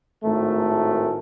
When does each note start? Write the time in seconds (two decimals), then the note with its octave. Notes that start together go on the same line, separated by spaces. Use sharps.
0.24 G#1 A2 A3 A#4